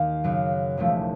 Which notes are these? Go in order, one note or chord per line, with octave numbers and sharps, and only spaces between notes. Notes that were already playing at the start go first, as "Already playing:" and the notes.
Already playing: D#2 D#3 F5
F#2 C#3 F#3
E1 D#2 C#3 F3 A3